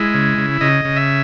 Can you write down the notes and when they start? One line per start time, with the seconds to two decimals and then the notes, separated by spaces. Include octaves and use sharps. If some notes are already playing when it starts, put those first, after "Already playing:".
Already playing: G#3 E4
0.14 C#3
0.38 C#3
0.61 C#3 D#5
0.85 C#3
0.96 E5